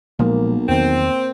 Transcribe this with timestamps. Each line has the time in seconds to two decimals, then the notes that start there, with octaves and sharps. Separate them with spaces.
0.19 B1 A#2 F3 G#3 A#3
0.69 E2 D#3 C4